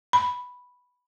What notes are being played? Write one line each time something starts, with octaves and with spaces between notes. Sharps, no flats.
B5